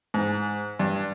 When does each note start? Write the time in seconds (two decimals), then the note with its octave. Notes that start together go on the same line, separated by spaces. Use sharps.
0.14 G#2
0.79 G2